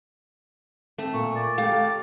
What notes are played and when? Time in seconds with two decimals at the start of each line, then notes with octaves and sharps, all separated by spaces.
0.98 A3 C4
1.13 A#2 C#6
1.35 D5
1.58 A3 G4 A4 F5